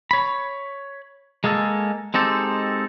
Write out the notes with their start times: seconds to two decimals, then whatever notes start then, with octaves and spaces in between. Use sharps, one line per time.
0.11 C#5 B5
1.44 G#3 A#3 G#4 A4
2.14 G#3 C4 D#4 G4 A4